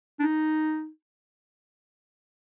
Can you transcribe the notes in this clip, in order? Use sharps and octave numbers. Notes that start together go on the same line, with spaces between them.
D4
D#4